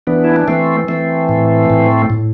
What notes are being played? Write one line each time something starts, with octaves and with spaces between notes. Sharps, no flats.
E3 B3 D4
E4
D4
E3 A3 C4
E3 A3 C4
A2
A2
A2